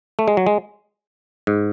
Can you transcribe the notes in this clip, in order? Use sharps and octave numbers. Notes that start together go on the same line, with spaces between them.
A3
G#3
F#3
G#3
G#2